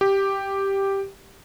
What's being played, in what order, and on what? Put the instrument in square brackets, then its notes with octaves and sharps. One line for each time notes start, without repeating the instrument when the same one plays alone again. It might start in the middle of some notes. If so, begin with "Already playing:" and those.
[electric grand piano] G4